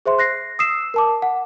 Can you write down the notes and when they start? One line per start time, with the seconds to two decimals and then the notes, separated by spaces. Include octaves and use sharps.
0.06 G#4 C5 E5 C6
0.19 F#6 A#6 C7
0.59 D#6 E6 C7 E7
0.94 A#4 A5 D6
1.22 F#5